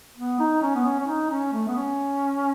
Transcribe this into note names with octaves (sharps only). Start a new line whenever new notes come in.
B3
D#4
C#4
B3
C#4
C#4
D#4
C#4
A3
B3
C#4